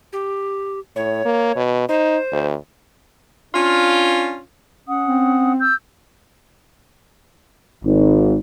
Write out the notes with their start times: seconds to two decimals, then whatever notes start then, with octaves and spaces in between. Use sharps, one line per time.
0.13 G4
0.96 A2 C#5
1.25 A#3
1.56 B2
1.89 D#4 C5
2.32 D2
3.54 C#4 D4 F4
4.88 C#4 F#5 D#6
5.08 C4
5.59 E6 G6
7.85 G#1